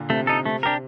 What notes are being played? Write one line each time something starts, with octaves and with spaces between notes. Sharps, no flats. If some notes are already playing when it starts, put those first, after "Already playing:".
Already playing: A#2 D3
C3 A3
D#4 A4
C3 A3
D4 G4 A#4